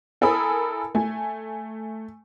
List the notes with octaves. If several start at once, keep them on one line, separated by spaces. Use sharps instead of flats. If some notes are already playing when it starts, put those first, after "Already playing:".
E4 A4 A#4 G#5 B5 D#6
A3 G#5